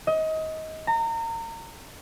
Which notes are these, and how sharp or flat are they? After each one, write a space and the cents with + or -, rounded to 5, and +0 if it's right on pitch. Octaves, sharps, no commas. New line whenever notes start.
D#5 +25
A#5 -30